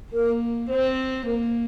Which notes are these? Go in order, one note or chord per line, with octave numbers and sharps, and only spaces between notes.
A#3 A#4
C4 C5
A#3 A#4